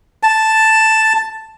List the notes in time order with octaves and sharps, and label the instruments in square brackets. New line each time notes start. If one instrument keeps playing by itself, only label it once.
[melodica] A5